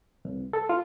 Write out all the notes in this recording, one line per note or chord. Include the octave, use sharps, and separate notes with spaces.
C2
A4
F4